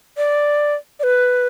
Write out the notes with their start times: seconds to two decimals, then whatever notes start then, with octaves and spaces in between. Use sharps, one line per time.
0.17 D5
1.00 D5
1.03 B4